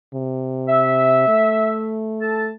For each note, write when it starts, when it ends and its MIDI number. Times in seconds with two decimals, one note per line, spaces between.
0.14 1.27 48
0.68 1.95 76
1.28 2.54 57
2.20 2.49 69
2.20 2.49 81